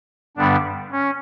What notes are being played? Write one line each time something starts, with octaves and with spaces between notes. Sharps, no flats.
G2 D3 G3 B3 D4
C#4